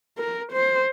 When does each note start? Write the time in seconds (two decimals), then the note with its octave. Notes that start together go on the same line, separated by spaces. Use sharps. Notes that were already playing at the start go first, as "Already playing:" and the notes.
0.18 A#4
0.52 C5